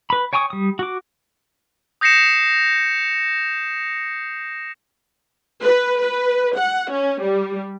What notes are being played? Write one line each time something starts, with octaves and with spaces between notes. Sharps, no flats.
B4 B5
C#5 G5 G#5 C#6 D#6
G3 D#6
F#4 D6
D#6 G6 A#6 C7 C#7 E7
B4
B4
F#5
C#4
G3